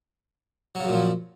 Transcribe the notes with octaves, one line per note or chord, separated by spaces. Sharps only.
F#2 A#2 C#3 F3 F#3